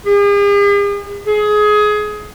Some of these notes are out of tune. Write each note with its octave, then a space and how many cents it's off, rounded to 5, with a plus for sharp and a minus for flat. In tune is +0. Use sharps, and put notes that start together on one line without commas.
G#4 -45
G#4 +20